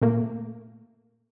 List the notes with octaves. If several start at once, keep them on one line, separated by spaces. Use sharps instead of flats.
A#2 A3 A#3